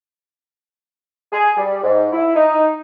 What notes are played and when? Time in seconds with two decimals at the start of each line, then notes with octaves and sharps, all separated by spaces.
1.32 G#4
1.57 G3
1.84 G#2
2.13 E4
2.35 D#4